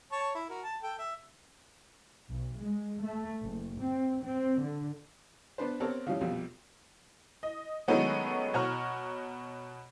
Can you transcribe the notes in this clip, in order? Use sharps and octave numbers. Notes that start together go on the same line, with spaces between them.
C#5 A5 C#6
E4
F#4 A#4
A5
A4 G5
E5
B1
G#3
A3
F#1
C4
C4
D3
B3 D4 B4 C5
B3 C4 G4 A4 A#4 C#5
C#3 E3 F3 G3 C#4
A#1 F2 B2 G3
D#5
D#3 F#3 G#3 A3 B3 C#4
B2 F#4 C#5 A#5 F6